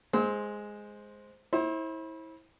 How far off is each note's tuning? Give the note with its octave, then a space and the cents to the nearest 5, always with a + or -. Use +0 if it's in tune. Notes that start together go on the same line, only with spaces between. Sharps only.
G#3 +0 C5 +0 E6 -45
E4 -25 C5 +35